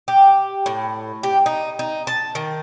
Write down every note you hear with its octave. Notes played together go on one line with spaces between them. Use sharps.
G4
A2
G4
D#4
D#4
A5
D#3